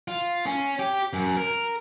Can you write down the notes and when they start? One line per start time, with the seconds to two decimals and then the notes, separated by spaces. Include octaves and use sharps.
0.08 F4
0.46 C#4
0.79 G4
1.13 F#2
1.37 A#4